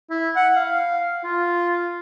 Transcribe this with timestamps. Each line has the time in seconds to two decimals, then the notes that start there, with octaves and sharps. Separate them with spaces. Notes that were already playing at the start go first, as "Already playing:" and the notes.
0.10 E4
0.36 F#5
0.56 F5
1.24 F4